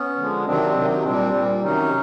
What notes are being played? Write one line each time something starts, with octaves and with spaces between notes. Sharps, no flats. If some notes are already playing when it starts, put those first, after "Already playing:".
Already playing: B3 C#4
D3 F3 G#3
C3 D#3 F#3 C4 D4
C3 D#3 F#3
A#2 G3 C4 D4
A#2 G3
C3 D#3 F#3 C#4 D#4